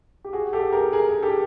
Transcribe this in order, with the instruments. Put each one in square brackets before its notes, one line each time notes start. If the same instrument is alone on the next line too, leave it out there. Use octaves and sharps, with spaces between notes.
[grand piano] G4
F#4 G#4
G4 A4
G#4 A#4
G#4 A#4
G4 A4